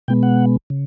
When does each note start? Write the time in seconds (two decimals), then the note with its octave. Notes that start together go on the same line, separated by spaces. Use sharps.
0.08 B2 G#3 B3 G5
0.23 F#5
0.70 C#3